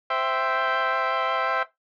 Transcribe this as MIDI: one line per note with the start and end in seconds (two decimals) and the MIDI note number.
0.10 1.63 72
0.10 1.63 76
0.10 1.63 79